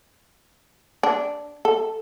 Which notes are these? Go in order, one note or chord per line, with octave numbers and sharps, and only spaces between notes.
D4
A4